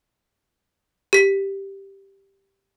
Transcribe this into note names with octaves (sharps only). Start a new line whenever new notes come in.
G4 B6